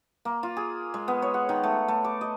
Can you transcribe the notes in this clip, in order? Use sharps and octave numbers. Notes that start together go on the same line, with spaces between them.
A#3
F4
G#4
G#3
B3
C#5
F#5
D#3
A3
A3
D6
D#5